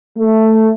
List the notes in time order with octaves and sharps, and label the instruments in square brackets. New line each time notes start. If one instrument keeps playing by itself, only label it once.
[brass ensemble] A3